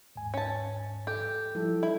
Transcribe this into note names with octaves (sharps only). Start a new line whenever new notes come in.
D#2 G#2 G#5
C#4 A5
G4 A4
F3 G3 E4 A4
E4